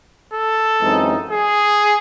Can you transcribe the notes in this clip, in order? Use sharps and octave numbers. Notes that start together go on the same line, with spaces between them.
A4
F#2 E3 G#3 C4 D#4
G#4